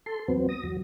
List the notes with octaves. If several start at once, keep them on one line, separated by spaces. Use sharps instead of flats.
A4 C6
E2 F#3 B3 C4
D#6 A#6
E2 F#3